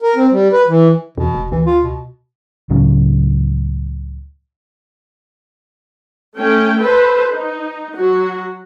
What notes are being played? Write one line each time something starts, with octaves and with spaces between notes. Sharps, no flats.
A#4
C4
G3
B4
E3
E2 B2
E1
D2 E3
F4
B2
C#2 A2 C#3 F#3
A3 C#4 G5
A4 B4 C5
D#4
F#3 F#4